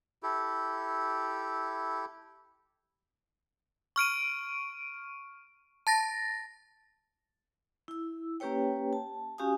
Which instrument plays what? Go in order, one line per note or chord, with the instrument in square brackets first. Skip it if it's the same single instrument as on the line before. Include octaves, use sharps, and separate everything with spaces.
[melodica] E4 G4 A4
[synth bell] C#6 F6 D7 D#7
A5 A6 A#6
[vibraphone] E4 E6
A#3 C#4 G4 B4 C#5 G5
A5
C#4 F#4 G4 F5 G#5 D#6